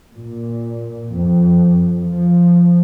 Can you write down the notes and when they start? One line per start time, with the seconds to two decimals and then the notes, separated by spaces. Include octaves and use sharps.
0.15 A#2
1.14 F2
2.04 F3